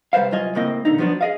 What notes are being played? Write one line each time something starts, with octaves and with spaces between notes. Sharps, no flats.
C3 G3 B4 C5 F5
C2 F#3 F4 D#5 G#5
A2 C#3 A#3 C4 D#5
A#2 D3 D#4
F3 F#3 B3 C4 D4
G#4 D#5 F5